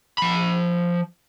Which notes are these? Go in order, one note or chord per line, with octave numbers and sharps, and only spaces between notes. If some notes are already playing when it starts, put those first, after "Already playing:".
F3 B5